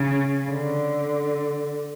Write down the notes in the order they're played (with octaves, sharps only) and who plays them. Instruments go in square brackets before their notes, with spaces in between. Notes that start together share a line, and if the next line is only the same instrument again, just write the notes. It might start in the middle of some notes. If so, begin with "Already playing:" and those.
Already playing: [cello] C#3
D3